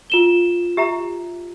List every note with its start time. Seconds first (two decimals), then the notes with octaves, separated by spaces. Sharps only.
0.10 F4 E7 G7
0.77 G4 E5 A#5